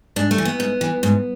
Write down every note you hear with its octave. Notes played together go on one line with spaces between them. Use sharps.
G#2 D4
A3
E3
B3
G#2
E3
G#2